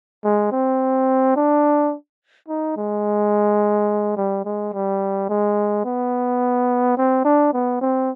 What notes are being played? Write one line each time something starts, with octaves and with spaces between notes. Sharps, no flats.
G#3
C4
D4
D#4
G#3
G3
G#3
G3
G#3
B3
C4
D4
B3
C4